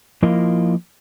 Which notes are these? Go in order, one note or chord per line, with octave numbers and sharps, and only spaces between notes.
F3 A#3 E4 F4 A#4 D#5